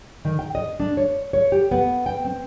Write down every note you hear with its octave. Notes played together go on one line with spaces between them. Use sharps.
D#3
G5
D#5
D4
C#5
C#5
G4
B3
G5
C4